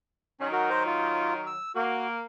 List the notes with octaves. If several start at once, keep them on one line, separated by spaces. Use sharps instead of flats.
D#3 F#3 C#4 D#4
F#4 A#4
C5 A#5
F4
E6
A#3 F#4